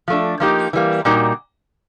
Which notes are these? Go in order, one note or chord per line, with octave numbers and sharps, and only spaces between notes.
F3 A3 D4
F3 A#3 D#4 G4
E3 G3 A#3
A#2 G3 A#3 D#4 F#4